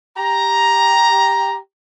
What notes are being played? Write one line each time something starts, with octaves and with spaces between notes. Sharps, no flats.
G4 A#5